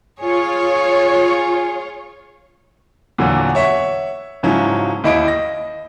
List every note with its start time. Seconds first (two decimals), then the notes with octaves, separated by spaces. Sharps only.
0.20 F4 G#4 C#5
3.18 E2 A#2 D3 F#3
3.55 C#5 E5 F#5 C#6
4.43 G#2 C#3 F3 F#3 C#4 E4
5.04 D#2 E4 D#5 B5 D7
5.25 D#5 A#6